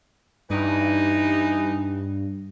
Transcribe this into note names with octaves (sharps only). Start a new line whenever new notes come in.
G2 E3 D#4